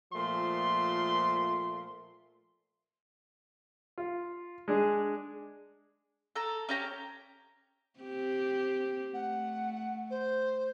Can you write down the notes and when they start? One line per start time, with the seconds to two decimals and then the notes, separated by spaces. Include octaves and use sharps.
0.13 A#2 F3 A3 C6
3.98 F4
4.68 G#3 D4 G#4
6.36 A4 A#5
6.69 C#4 G4 A#5
8.00 C4 G4
9.14 A3 F#5
10.10 C5